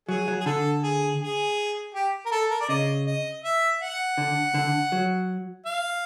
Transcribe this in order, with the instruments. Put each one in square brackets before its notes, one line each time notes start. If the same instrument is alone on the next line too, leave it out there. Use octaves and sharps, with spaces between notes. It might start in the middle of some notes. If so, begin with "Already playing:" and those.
[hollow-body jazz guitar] F#3 [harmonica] G#4
[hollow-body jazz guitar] F#3
[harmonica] G#4
[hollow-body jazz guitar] D3 [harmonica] A4
[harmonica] G#4
G#4
G4
A#4
A4
A#4
D5
[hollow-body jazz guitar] C#3 [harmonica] D#5
[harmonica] D#5
E5
F#5
[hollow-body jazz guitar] D3
D3
F#3
[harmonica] F5